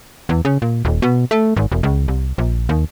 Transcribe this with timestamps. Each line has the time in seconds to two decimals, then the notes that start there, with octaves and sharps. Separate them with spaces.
0.29 E2
0.45 C#3
0.62 A#2
0.85 D#1
1.02 B2
1.31 A3
1.57 G#1
1.72 E1
1.83 C#2
2.08 C2
2.38 A#1
2.69 D#2